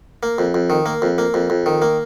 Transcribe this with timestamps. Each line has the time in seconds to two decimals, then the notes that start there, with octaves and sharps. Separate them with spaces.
0.23 A#3
0.38 F2
0.54 F2
0.70 D#3
0.86 A#3
1.02 F2
1.18 A#3
1.34 F2
1.50 F2
1.66 D#3
1.82 A#3